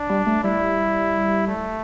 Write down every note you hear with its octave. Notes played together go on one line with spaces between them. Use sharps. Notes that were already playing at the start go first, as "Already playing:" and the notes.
Already playing: D4
G3
A3
G3 E4
A3